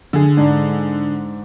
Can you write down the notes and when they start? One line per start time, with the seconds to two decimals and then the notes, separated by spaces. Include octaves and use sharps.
0.13 D3 G#4
0.37 G#2 D4